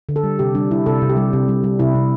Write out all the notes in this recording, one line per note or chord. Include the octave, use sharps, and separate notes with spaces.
D3
A4
G3
C3 G4
G3 D4
G3 E4
C3 A4
C3
G4
G3
C3
G3
G3
C3 E4
C3